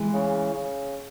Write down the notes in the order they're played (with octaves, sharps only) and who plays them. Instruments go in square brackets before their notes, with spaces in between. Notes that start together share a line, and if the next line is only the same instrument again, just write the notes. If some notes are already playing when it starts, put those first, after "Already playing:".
Already playing: [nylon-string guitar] E3 G#3
[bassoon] C#3
C#3